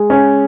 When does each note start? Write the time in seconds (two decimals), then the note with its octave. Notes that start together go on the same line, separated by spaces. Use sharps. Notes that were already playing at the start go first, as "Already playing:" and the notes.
Already playing: G#3
0.10 C#4